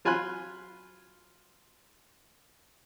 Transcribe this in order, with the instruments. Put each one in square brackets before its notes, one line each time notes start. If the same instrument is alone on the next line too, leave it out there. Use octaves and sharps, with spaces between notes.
[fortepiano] F#3 F4 G#5 B5 C6 F#6